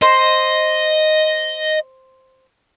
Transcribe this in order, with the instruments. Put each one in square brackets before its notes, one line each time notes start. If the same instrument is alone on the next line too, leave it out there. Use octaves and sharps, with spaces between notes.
[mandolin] C5 [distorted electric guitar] D#5